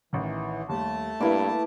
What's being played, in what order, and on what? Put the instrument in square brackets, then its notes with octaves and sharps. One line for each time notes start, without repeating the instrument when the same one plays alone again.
[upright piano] A1 D#3 [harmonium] E3
[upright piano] D#2 G3 [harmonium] A3 A5
[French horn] G2 [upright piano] A#3 [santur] E4 B4 D6